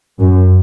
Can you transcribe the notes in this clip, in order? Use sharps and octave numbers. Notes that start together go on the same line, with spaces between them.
F#2